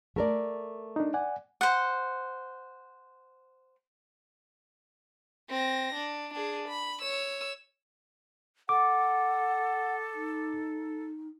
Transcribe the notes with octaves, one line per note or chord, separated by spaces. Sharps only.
A3 A#4 D5
D4 D#4
D5 F#5 G#5
C5 F#5
C4 A#6
D4
D4 G#4
B5
C#5 E6
A4 F#5 D6
D#4